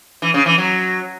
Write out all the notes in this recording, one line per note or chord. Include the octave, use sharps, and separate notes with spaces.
E3
C#3
E3
F#3